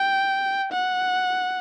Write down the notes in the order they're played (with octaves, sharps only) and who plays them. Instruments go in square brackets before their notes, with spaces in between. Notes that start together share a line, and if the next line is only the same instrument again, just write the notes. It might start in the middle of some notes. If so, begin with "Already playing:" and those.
Already playing: [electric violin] G5
F#5